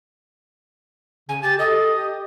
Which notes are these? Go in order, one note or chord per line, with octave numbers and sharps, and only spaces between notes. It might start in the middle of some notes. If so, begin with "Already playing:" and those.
C#3 G#5
G4 A6
A4 D#5
G4